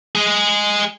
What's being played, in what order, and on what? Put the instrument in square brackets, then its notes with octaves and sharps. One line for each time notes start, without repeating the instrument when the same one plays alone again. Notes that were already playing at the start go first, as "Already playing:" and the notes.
[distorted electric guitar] G#3 G#4